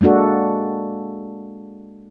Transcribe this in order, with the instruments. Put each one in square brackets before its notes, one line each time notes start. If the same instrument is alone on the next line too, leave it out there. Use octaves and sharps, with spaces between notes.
[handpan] G#3 A#3 D4 F#4 A4